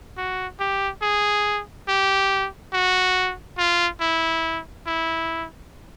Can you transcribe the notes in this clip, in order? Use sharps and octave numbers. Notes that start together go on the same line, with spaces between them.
F#4
G4
G#4
G4
F#4
F4
E4
E4